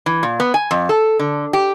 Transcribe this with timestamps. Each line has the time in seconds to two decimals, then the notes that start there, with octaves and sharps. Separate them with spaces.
0.06 E3
0.23 A#2
0.40 B3
0.54 G#5
0.71 F2
0.89 A4
1.19 D3
1.53 G4